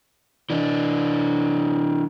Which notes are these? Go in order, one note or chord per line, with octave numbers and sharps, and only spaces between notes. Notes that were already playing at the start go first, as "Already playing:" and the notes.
E3 D4